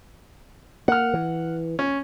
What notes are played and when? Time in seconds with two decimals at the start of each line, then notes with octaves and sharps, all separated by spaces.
0.88 A#3 F#5 F6
1.14 E3
1.79 C#4